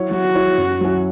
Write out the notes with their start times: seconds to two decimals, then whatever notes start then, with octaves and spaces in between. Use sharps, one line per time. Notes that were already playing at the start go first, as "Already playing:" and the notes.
Already playing: F#3 E4 C#5
0.11 F#3 F#4
0.35 E4 C#5
0.58 F#2
0.81 F#3 C#4 E4